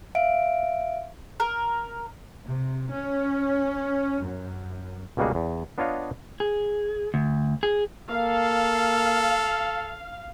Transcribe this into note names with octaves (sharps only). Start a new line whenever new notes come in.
E5 F5 D7
A#4
C3
C#4
F#2
C#2 B2 G3 A#3 F#4 G#4
E2
B3 D4 F4 C#5 D#5 F5
G#4
D2
G#4
A#3 A4 F5